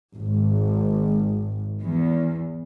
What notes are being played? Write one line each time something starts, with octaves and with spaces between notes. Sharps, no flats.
G#1
E2